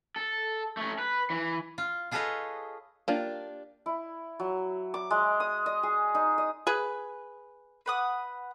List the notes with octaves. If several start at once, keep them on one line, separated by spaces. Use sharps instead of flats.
A4
A3 C#4
B4
E3
F4
F4 G#4 A4 B4 C#5 D#5
A#3 D4 F4 G4
E4
F#3
D6
G#3
D#6
D#5
G#4
D#4
D#5
G#4 B4
B4 F#5 D#6